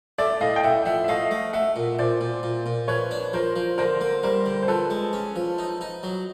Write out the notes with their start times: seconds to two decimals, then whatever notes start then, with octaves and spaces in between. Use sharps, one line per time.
0.19 A3 D5 E5
0.41 A2 D#5 F5
0.56 G5
0.64 A2 E5 F#5
0.86 F3 E5 F#5
1.04 E5
1.08 A3 D#5 F5
1.31 A3
1.53 A3 E5 F#5
1.76 A#2
1.99 A#2 C5 D5
2.21 A#2
2.43 A#2
2.66 A#2
2.88 F3 B4 C#5
3.11 D4
3.33 F3 A#4 C5
3.56 F3
3.78 D3 A#4 C5
4.01 A#3
4.23 G3 A#4 C5
4.46 D3
4.63 C5
4.68 F3 A4 B4
4.90 G#3
5.13 C#4
5.36 F3
5.58 D#4
5.81 D#4
6.03 F#3